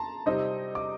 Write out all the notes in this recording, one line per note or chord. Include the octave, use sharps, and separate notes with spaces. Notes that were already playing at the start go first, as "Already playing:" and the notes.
Already playing: A5 A#5 C6
C3 G3 C4 D#4 D#5
D6